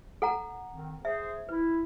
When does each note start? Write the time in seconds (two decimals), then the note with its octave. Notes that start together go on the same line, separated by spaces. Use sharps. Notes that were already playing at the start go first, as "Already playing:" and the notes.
0.22 A4 F#5 A#5
0.72 D#3 C4
1.05 G#4 C5 E5
1.49 E4 B4